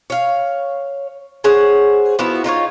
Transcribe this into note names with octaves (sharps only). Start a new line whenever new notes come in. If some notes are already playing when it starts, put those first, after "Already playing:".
C#5 F5
G#4 C5 C#5 F#5
F3 B3 E4 F#4
D#4 F4 B4 C#5